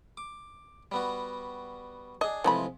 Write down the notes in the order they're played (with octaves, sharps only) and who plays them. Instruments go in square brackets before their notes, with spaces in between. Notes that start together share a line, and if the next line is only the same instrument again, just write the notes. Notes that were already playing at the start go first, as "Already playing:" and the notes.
[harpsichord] D6
G3 B3 F#4
[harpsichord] D4 G#4 [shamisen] D#5
[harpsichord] C3 F3 G#3 [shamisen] E3 A3 B5